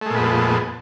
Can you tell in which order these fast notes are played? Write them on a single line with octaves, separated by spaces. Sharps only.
A3 G#3 A#2 B3 F2